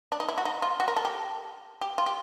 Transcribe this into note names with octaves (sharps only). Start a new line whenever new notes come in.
D4
D#4
E4
F#4
D#4
F4
F#4
A#4
A4
G4
G4
F4
G4